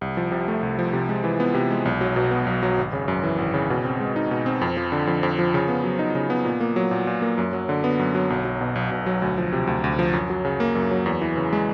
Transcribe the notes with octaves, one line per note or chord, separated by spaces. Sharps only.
C2
F3
C3
A3
C2
F3
C3
G#3
E3
B3
C3
G#3
B1
F#3
B2
B3
B1
F#3
G#1
C#3
F#2
E3
G#1
C#3
B2
C4
G#3
D#4
B2
C4
F2
F3
D3
F2
F2
F3
C#3
B3
F#3
D#4
C#3
B3
A#2
A#3
F#3
A#2
A#2
A#3
F#2
F#3
D3
B3
F#2
F#3
B1
F#3
B2
B1
B1
F#3
D2
F3
C3
D2
D2
F3
F#2
F#3
C#3
A#3
F#2
F#3
E2
E3
C#3
G#3